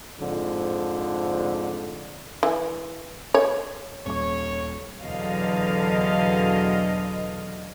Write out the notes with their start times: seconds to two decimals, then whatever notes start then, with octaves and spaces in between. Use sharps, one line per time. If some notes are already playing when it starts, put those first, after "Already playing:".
0.21 F2 G#2 D3 F3
2.43 E3
3.34 C#5
4.06 D#1 C#5 C#6
5.04 E2 B2 D3 F#3 D#5 F5